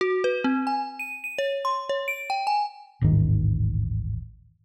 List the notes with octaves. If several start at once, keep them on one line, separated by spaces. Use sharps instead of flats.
F#4
B4
C4
G#5
D#7
D#7
C#5
C6
C#5
D7
G5
G#5
D#1 A1 G#2 D#3